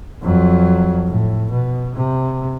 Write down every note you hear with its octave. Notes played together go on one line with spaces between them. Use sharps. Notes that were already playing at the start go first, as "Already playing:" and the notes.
F2 F#3
A2
B2
C3